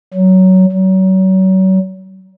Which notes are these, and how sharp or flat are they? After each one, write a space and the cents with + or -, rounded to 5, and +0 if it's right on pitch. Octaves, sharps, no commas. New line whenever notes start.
F#3 +15
F#3 +35